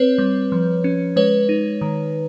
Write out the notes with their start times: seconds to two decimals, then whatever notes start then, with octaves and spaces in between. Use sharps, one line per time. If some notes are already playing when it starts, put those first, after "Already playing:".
Already playing: C4 B4 C#5
0.18 G3
0.52 F3
0.84 C#4
1.16 G#3 B4 C#5
1.49 D#4
1.81 D#3